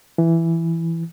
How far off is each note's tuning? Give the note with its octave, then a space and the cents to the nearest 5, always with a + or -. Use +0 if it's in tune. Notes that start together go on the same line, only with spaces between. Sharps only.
E3 +5